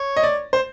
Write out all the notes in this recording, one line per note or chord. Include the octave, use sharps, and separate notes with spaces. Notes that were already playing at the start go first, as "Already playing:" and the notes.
Already playing: C#5
D#5
D5
C5